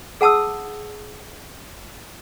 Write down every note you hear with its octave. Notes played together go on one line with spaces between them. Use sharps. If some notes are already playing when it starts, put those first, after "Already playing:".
G#4 F#5 A5 D#6 E6